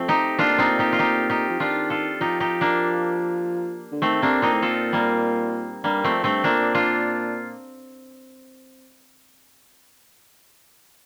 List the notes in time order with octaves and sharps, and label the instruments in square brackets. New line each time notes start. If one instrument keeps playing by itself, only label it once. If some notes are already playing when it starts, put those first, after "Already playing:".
Already playing: [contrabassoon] F2 [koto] A3 C4
[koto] D#4 G4
[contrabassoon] A#2 [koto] D4 F4
[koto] C4 D#4
D#4 G4
F4
D#4 G4
D#4 G4
[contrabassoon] F3
[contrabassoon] D#3 [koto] D4 F4
[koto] F4 A4
[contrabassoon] F3 [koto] D#4 G4
[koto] D#4 G4
A#3 D4
[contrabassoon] D3
[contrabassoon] D#3 [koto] A3 C4
[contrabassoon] C3 [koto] A#3 D4
[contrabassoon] A#2 [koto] C4 D#4
[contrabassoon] A2
[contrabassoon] A#2 [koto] F4 A4
[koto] G3 A#3
[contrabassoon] G2 [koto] G3 A#3
[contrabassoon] F2 [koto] A3 C4
[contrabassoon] G2 [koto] A3 C4
[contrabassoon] A#2 [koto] A#3 D4
[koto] D4 F4